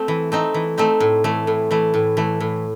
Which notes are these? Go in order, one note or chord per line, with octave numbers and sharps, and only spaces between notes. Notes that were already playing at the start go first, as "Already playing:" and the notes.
Already playing: A3 C4
E3
A3 C4 D#4
E3
A3 C4 D#4
A2
E3 A3
A2
E3 A3
A2
E3 A3
A2